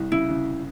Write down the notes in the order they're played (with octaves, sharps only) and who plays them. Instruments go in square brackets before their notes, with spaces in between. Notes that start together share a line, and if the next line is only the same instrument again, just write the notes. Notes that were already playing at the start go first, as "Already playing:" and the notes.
Already playing: [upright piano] C2
[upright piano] C#3 [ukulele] E4
[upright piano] C#3